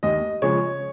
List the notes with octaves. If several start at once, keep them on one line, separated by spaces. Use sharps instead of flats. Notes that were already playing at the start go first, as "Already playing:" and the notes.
D#2 D#5
C#3 F3 G#3 C#5